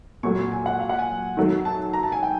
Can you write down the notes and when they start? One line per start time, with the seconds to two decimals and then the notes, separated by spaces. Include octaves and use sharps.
0.23 A#2 F#3 A3 C#6
0.52 G#5
0.66 F#5
0.80 F5
0.89 F#5
0.99 G#5
1.37 D#3 F#3 A3
1.65 A5
1.93 A#5
2.03 A5
2.12 G#5
2.23 G5